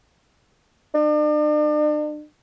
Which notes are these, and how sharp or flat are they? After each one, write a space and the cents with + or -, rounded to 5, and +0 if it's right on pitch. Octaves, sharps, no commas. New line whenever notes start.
D4 +40